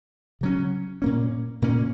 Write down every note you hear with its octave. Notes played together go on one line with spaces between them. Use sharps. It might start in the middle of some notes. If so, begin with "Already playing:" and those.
C#3 F#3 C#4
A#2 A#3 C#4
A#2 A#3 C#4